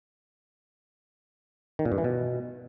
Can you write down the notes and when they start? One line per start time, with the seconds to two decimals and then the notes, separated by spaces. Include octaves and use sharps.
1.79 D#3
1.85 A#2
1.92 G2
1.98 E3
2.04 B2